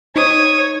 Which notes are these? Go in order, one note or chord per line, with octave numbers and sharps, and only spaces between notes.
D#4 C#5 D#6